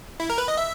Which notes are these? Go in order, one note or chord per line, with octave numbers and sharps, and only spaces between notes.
E4
A#4
B4
D#5
E5